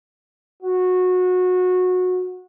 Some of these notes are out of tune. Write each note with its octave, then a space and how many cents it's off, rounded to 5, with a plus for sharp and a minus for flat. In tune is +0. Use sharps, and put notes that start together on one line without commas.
F#4 -20